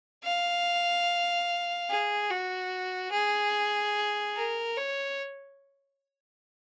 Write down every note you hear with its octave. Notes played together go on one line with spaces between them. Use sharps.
F5
G#4
F#4
G#4
A#4
C#5